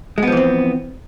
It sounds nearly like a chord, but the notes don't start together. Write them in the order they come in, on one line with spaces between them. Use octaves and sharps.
G#3 B3 F3 E3 C4